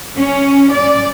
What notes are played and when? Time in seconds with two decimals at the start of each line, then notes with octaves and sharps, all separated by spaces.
0.16 C#4
0.71 D5